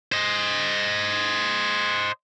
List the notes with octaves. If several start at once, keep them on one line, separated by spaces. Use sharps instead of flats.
C5 D#5